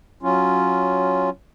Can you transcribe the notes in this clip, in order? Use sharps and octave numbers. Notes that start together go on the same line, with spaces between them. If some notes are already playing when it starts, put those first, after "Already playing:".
F#3 C#4 F4